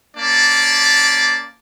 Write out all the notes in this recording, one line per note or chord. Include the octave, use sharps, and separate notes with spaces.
A#3 C#4 D5 A5